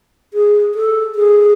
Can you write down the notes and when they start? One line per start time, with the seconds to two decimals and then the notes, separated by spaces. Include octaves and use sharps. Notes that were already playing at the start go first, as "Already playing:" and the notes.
0.34 G#4
0.75 A4
1.15 G#4